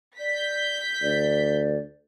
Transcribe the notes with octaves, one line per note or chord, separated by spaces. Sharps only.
D5 G6 B6
D2 D5